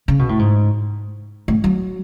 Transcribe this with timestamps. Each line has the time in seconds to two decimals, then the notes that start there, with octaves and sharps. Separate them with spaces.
0.08 C#3
0.19 B2
0.29 A2
0.39 G#2
1.48 A2
1.64 F#3